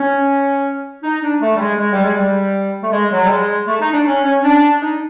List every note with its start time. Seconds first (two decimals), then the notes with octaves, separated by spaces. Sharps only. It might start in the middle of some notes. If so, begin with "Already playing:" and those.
Already playing: C#4
1.03 D#4
1.22 D4
1.41 A3
1.55 G3
1.60 G#3
1.79 G#3
1.91 G3
2.03 G#3
2.16 G3
2.82 A3
2.92 G#3
3.11 F#3
3.25 G3
3.29 G#3
3.68 A3
3.80 D#4
3.93 D4
4.06 C#4
4.24 C#4
4.43 D4
4.81 D#4